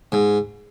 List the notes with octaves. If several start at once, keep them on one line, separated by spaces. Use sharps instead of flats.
G#2